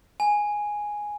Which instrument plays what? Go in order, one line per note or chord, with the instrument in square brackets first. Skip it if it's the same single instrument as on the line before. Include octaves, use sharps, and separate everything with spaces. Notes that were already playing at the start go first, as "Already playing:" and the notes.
[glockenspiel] G#5